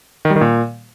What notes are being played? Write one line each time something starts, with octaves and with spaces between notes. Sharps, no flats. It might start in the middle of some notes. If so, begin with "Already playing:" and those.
D#3
G3
D#3
A#2